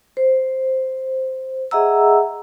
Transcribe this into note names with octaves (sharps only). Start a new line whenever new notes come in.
C5
G#4 D#5 E5 F#5 A#5 E6